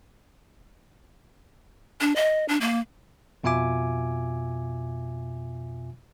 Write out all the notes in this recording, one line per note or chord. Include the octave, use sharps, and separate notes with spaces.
D4
D#5
D4
A#3
F2 B2 F4 E5 G#5 D6